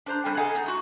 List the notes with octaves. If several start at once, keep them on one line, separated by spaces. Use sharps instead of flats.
D4 C5 A#5
G3 C4 C#4 A4
G#4 A4 D#5 F#5 G#5 A#5
B3 D#4
A3 F#4